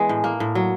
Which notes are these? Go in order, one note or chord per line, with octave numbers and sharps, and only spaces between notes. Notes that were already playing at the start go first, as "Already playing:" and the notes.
Already playing: E3 G#3 B3
A2
A#3
A2
F#3